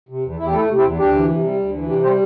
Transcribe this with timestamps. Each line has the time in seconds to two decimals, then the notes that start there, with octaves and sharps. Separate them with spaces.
0.09 C3
0.24 E2
0.38 E2 E4
0.46 G4
0.53 A3 E4 A4
0.69 C3
0.77 C4 E4
0.83 E2
0.98 D2 D4 G4
1.14 E3
1.29 C3
1.43 G3
1.58 D2
1.74 E3
1.89 C3 D4 G4
2.04 G3 G4 C5